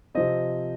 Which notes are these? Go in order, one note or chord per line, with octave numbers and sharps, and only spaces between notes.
C3 F3 C4 D#5